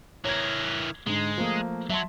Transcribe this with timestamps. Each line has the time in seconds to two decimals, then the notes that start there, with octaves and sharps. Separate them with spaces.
0.25 E3 A#4 C#5 G#6
1.07 G#2 D3 G#3
1.38 F3 A3 A#3
1.90 F#3 E5 A5 C6